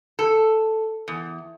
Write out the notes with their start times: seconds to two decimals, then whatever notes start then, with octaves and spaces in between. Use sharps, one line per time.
0.19 A4
1.08 E2